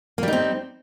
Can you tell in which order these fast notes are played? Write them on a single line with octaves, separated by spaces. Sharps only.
A#3 G3 D#4 C4